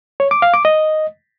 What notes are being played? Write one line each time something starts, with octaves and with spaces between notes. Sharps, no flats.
C#5
D6
F5
D6
D#5